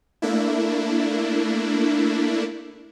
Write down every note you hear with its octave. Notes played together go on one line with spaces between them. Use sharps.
A3 A#3 D4 E4